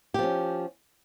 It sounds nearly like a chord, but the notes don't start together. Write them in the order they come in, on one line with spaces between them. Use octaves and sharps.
G4 F3 C#4